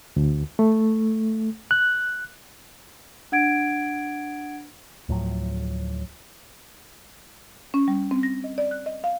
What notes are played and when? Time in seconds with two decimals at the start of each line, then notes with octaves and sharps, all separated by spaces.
0.16 D2
0.59 A3
1.71 F#6
3.32 D4 F#5 G#6 D7
5.09 D2 A2 F3 F#3
7.74 C#4
7.88 G3
8.11 C4
8.23 A#6
8.44 D#5
8.58 D5
8.71 F#6
8.86 D#5
9.04 F5